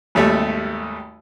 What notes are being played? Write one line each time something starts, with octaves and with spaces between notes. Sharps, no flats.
G#1 D#2 G3 A3 E5